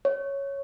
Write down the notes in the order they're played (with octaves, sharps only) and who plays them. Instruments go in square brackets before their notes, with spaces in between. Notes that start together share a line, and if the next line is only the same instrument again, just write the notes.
[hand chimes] C#5